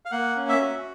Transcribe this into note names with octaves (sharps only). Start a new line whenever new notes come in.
F5
A#3 F#5
C#4
E5
F#4